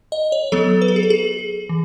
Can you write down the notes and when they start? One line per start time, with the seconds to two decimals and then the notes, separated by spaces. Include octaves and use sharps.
0.12 D#5
0.32 C#5
0.52 F#3 B3 A4
0.82 B4
0.88 A4
0.96 G#4
1.03 A4
1.10 G#4
1.69 E3